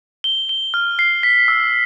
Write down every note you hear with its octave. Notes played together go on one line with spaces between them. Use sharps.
G7
G7
F6
C7
B6
E6